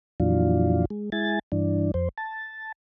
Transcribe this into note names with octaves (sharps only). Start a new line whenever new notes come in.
F2 A#2 E3 F#3 D4 F4
G#3
G#3 E4 G#5 A6
G2 E3 D4
F2 C5
A5